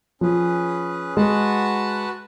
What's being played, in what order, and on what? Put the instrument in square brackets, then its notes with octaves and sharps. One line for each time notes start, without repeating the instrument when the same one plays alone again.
[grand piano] F3 [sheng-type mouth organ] C#4 G#4 B4
[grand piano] G#3 [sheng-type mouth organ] F#4 B4 F#5 A5